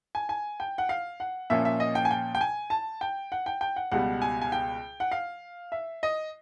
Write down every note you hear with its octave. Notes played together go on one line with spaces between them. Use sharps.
G#5
G#5
G5
F#5
F5
F#5
A#2 F3 A#3 C#4 E5
E5
D#5
G5
G#5
G5
G5
G#5
A5
G5
F#5
G5
G5
F#5
C#2 B2 G3 F#5
G#5
G#5
G5
F#5
F5
E5
D#5